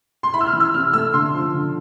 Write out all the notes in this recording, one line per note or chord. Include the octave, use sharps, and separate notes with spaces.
C6
E4 B5
E6
F6
E3
E6
C3 F6
A3 E6
D3 C6
F3
D3